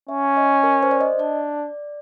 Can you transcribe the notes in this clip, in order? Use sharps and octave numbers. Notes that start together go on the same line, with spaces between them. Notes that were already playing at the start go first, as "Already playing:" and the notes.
C#4 E5
D#5
A#4
C5
D5
D#5
D4 D5